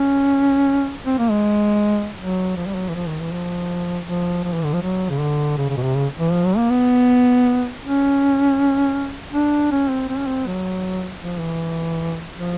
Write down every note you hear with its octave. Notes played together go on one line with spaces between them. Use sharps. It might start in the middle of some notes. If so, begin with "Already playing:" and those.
Already playing: C#4
C4
A#3
G#3
F#3
F3
G3
F#3
E3
F3
D#3
E3
F3
F3
F3
E3
D3
F3
F#3
C#3
D3
C#3
C#3
B2
C3
C#3
E3
F3
F#3
A#3
B3
C#4
D4
C#4
C4
C4
C#4
C4
F#3
F3
E3
F3